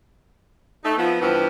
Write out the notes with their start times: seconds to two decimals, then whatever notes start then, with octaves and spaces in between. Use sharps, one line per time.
0.83 A3 D#4
0.97 F3 B3
1.21 G2 E3 F3 B3 C5